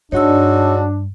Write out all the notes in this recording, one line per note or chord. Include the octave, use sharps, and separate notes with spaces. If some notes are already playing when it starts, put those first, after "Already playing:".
G2 G#3 D4 D#4 F#4 C#5 E6